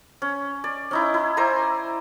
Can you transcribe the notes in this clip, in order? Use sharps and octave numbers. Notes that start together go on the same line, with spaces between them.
C#4
D5
C#4 D#4 E4
E4
C5 D5 G#5 A#5